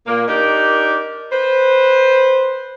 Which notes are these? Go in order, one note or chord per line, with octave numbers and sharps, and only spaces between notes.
A#2 A#3
D4 D#4 G4 A#4
B4 C5